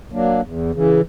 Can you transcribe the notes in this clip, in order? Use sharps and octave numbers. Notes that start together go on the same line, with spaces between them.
F#3 A#3 D4
E2
C#3 E3